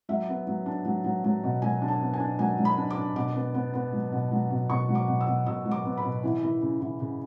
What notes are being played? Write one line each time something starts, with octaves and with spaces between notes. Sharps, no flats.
F#3 E5
B3
F#3
D4
F#3
F#3
F#3
B2
F#3 G#5
D4
A5
B3
G#5
D4
F#3 G#5
F#3
B5
D4
D6
D4
B2 D6
B3
B3
B3
F#3
B2
F#3
B2
B2 C#6
F#3
D6
B2
E6
B2
B2 E6
F#3
D6
B3
B5
B2
E3
E3
C#3
E3
C#3